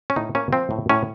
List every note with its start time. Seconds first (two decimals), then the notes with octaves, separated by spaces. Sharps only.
0.10 C#4
0.16 A2 D#4
0.35 A#3 C#4
0.53 F3 C4
0.71 A2
0.89 A2 C#4